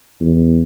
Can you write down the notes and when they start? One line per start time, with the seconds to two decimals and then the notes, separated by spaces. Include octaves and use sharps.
0.21 E2